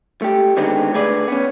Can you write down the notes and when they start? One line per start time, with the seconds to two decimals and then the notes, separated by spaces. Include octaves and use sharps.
0.22 A3 G4
0.57 D3 D#3 G#3 B3 C4
0.94 D3 A3 G#4 B4 D5
1.28 B3 C#4